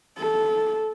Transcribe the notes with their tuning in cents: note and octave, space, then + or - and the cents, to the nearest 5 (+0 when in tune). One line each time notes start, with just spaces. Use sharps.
A4 -15